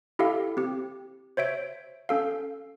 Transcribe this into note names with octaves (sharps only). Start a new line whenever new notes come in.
E4 G4 A4 E5 F5
C4 G4
C5 C#5 E5 D7
C#4 A4 F5